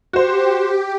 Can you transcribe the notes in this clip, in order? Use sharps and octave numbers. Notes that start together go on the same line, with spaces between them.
F#4 G4 C5